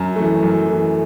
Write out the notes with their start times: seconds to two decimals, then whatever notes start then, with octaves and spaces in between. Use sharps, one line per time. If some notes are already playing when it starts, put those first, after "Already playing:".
Already playing: F#2
0.16 E3 A3
0.43 F#2
0.68 E3 A3